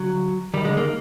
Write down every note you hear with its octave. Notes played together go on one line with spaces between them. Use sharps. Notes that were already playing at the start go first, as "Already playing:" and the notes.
Already playing: D3 F#3
D#3 G3
D3 G#3
D#3 A#3